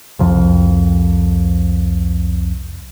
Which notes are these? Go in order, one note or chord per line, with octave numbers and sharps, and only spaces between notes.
C2 F2